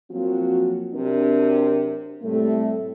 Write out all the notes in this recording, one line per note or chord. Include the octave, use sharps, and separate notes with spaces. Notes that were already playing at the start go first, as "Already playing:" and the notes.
F3 F#3 A#3 C4 F4 F#4
C3 F#3 C4 D4 A#4
A2 C3 G3 A3